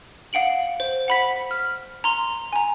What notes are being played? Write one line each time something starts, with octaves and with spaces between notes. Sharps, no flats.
F5 F#5 D7 F#7
C5
F#5 B5 B6
F6
A#5 C6
G#5 A#5